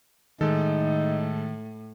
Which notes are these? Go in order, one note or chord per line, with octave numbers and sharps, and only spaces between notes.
A2 D#3 G#3 D#4 A4